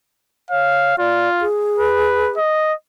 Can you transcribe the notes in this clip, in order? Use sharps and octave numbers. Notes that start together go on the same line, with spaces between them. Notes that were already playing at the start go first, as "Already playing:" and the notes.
C#5 F5
F4 D5
G#4
B4
D#5